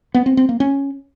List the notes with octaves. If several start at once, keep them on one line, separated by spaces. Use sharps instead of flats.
B3
C4
C4
A#3
C#4